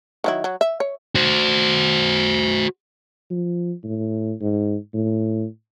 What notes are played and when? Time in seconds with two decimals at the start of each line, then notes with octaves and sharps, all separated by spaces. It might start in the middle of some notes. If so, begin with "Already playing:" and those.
0.24 D#3 F#3 E4
0.44 F#3
0.61 E5
0.80 C#5
1.15 F#4 C5
3.30 F3
3.84 A2
4.41 G#2
4.94 A2